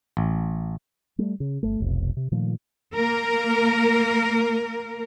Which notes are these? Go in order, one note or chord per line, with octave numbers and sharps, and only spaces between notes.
A1
G3 A3
C#3
G1 A3
F1 B1 C3
C3
A#2 D#3 F3 A3
A#3 A#4